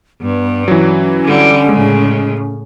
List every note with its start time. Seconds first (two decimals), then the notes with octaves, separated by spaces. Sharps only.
0.21 G2 B3
0.68 E3 F#3 C#4
1.25 D3 G3
1.69 A2 C#3 G#3